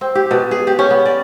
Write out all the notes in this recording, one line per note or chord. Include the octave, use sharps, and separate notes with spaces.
C4
G4
B2
G#4
G4
C#4
B3
D5